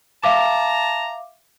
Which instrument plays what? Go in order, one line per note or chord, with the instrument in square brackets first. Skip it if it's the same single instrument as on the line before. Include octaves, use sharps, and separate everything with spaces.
[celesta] E5 F5 D6 [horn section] A5 A#5